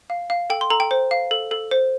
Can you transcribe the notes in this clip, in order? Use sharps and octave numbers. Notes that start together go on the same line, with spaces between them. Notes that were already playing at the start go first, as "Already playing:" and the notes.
F5
F5
A4 G5
C6
A4 A#5
G5
C5
F5
A4
A4
C5